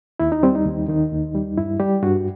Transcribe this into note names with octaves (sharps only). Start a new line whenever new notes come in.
D#2 E4
D#4
G3 C4
D#4
D#2
D#3 D#4
D#2
G3
G2 E4
G3 G4
G2 F#4